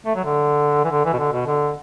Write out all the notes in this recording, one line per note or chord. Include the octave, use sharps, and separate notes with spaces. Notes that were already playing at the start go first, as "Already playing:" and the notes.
A3
F#3
D3
E3
D3
E3
B2
D3
B2
D3